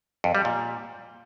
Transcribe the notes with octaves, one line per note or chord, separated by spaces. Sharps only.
F2
G3
A#2